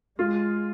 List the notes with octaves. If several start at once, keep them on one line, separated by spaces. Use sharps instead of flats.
G#3 F4